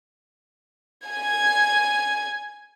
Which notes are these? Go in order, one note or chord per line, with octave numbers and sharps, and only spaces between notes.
G#5 G#6